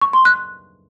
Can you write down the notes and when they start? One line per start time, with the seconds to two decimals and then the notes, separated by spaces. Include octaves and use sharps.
0.01 C#6
0.13 C6
0.25 F#6